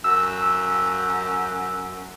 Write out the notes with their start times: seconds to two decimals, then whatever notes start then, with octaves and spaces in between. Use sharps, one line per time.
0.04 F#2 E6